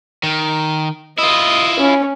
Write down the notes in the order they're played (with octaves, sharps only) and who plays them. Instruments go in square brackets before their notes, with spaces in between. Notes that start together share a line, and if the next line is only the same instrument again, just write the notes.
[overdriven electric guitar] D#3
[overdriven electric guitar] E4 F4 [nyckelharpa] D#5
[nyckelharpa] C#4